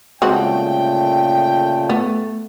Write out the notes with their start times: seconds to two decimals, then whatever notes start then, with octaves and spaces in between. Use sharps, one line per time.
0.22 G1 A#2 C#3 G#3 A3 C4 F#4 G5
1.89 A3 B3